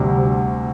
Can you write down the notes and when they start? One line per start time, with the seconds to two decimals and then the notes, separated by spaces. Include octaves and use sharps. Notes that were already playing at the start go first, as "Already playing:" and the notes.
Already playing: D2 C3 G3